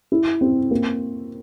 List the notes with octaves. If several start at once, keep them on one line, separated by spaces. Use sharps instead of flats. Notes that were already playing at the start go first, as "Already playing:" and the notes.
E4
C4
A#3